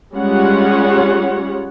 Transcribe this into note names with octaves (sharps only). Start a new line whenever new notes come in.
G3 G#3 C#4 F4 C#5 F#5